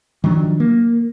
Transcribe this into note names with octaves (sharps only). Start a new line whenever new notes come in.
D#3 F3 F#3 D4
A#3